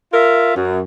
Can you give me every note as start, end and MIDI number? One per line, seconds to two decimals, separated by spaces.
0.13 0.54 65
0.13 0.54 70
0.13 0.54 76
0.55 0.81 42